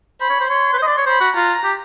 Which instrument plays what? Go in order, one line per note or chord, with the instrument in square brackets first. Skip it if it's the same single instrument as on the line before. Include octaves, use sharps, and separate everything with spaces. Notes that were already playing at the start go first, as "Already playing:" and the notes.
[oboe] C5 [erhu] B5
[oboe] C#5
C5
[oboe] C#5 [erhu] C6
[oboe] B4
C5
D#5
D5
C#5
[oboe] C5 [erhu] B5
[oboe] F#4
[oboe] F4 [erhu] A#5
[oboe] G4